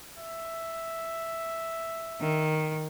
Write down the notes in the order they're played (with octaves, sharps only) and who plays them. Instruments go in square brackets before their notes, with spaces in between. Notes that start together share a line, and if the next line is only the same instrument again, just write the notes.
[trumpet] E5
[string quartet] D#3